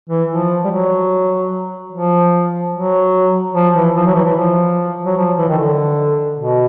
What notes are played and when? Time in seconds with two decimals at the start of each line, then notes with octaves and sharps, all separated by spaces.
0.10 E3
0.30 F3
0.64 G3
0.71 F#3
1.92 F3
2.74 F#3
3.54 F3
3.75 E3
3.96 F3
4.06 F#3
4.15 E3
4.25 E3
4.36 F3
5.06 F#3
5.17 F3
5.37 E3
5.49 D#3
5.58 D3
6.39 B2